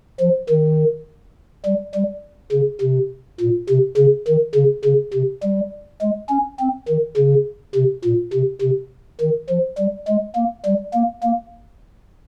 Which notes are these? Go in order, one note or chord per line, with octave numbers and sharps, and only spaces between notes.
F3
D#3
G3
G3
C#3
C3
A#2
C3
C#3
D#3
C#3
C#3
C3
G3
G#3
C#4
C4
D#3
C#3
C3
A#2
C3
C3
D#3
F3
G3
G#3
A#3
G3
A#3
A#3